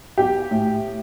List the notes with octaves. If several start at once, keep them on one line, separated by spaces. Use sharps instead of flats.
B1 G4
A2